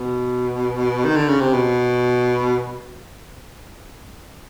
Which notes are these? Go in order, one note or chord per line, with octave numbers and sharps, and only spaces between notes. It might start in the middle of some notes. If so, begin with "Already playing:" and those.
Already playing: B2
D#3
D3
C#3
C3
B2